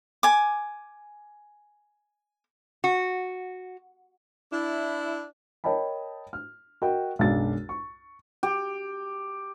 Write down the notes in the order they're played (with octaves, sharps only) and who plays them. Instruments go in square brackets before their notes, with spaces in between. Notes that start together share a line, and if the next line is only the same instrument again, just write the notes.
[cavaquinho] G#5 D6
[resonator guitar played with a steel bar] F#4
[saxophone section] D4 E4
[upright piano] A#4 C#5 D#5 G5 A5 B5
F6
F#4 A#4 D#5 G5
B1 F#2 G#3 D4 A6
C#6
[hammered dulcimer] G4